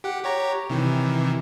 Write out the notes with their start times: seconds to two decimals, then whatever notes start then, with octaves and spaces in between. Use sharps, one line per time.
0.04 G4 F#5
0.24 G4 C#5 A#5
0.70 C3 D#3 E3